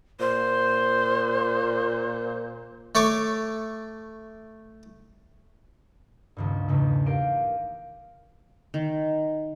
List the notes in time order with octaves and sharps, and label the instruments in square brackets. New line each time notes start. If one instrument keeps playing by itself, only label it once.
[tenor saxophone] A#2 [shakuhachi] C5
[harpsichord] A3 A4 C#5 D6
[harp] D#1 C#2 G2
B1 E2 G#2 C#3 A3
G4 A#4 F5 D7 D#7
[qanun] D#3